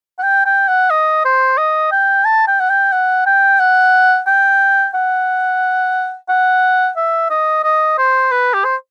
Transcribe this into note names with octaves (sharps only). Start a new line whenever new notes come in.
F#5
G5
G5
F#5
D#5
C5
D#5
G5
A5
G5
F#5
G5
F#5
G5
F#5
G5
F#5
F#5
E5
D#5
D#5
C5
B4
G4
C5